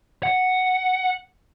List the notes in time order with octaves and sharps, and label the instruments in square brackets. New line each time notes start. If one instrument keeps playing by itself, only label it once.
[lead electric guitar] F#5